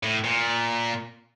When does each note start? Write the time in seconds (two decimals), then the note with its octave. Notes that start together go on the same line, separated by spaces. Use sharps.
0.03 A2
0.24 A#2